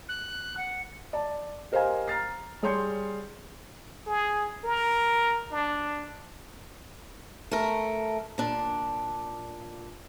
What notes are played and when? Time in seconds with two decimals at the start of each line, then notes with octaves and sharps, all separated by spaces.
0.09 F#6
0.57 F#5
1.13 D5 A5
1.72 G4 A#4 C5 D#5 F5 G#5
2.08 A#5 F6 A6 C7
2.62 G3 G#4 C#5 C6 G6 C#7
4.07 G#4
4.64 A#4
5.51 D4
7.51 A3 A#4
8.38 A#2 D4